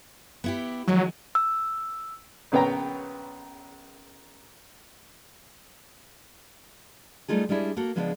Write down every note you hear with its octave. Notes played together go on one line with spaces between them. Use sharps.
B3 E4 G4
D#3 F3 F#3 G#3
E6
A#1 C#3 B3 C#5 G5 A#5
G3 A3 D#4 F4 G#4
G3 G#3 C#4 D4 E4 G#4
A#3 F#4 A4
C#3 F3 G#3 B3 C#4 D4